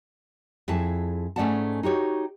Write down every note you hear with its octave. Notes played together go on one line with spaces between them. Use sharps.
F2 E4 G#4 A5
G#2 A3 C#4 D5 F#5 A5
D#4 F#4 G4 C#5